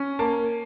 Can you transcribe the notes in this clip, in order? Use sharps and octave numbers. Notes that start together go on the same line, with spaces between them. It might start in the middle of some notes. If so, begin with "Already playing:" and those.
Already playing: C#4
A#3 A5